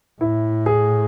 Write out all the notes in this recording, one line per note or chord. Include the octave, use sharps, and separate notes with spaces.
A2 E4
G#4